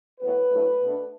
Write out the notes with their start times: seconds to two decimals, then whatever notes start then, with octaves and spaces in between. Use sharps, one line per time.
0.19 A2 F#3 B3 B4
0.50 A2 F#3 A3 D4
0.81 B2 A3 D4